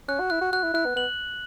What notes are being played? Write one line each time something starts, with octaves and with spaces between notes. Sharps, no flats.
C#4 F#6
F#4
E4 F#6
F#4
F#4 F#6
E4
E4 F#6
B3
B3 F#7